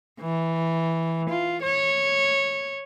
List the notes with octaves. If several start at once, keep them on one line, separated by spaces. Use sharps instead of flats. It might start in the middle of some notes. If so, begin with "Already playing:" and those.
E3
F4
C#5